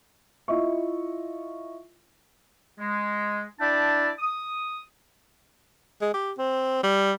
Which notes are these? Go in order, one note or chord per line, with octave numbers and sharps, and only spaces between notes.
E4 F4 D#5 E5 C#6
G#3
D4 E4 D5 E5 G5 A5
D#6
G#3
G4
C4
G3